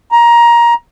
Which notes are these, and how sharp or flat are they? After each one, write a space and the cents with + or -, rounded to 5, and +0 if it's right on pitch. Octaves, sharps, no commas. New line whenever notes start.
A#5 +15